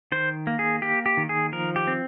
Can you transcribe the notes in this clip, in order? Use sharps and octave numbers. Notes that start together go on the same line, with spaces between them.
D#3 C5
A#3
G#4
A#3 G4
G4
D#3
G#4
F3 A#4
G4
C4